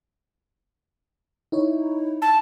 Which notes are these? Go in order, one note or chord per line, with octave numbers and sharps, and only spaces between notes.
D#4 E4 C#5
A5